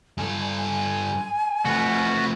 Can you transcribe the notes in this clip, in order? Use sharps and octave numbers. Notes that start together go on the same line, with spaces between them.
G2 A4 G#5
G#5
F3 A3 F#4 B4